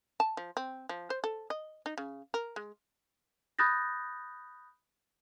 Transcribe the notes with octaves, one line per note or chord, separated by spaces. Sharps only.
A5
F3
C4
F3
C5
A4
D#5
D#4
C#3
A#4
G#3
B5 D#6 F#6 G6 A6 A#6